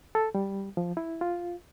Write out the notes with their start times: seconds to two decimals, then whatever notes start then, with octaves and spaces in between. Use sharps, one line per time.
0.15 A4
0.35 G3
0.77 F3
0.97 E4
1.21 F4